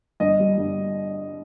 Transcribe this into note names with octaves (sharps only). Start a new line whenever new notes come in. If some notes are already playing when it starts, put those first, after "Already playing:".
G1 D#5
G3
G1